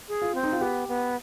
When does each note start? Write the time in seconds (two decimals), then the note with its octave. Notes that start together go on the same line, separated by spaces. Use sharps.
0.08 G#4
0.22 F4
0.35 C4
0.44 D#4
0.52 F4
0.61 B3 G4
0.88 B3